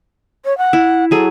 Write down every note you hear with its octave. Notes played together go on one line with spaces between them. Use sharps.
C#5
F#5
E4
F#3 G#4 A4